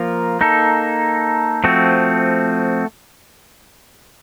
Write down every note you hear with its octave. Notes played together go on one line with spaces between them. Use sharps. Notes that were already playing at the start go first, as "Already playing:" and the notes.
Already playing: F3 A#3 F4 A#4
A#3 D#4 A4
F3 A3 C4 F#4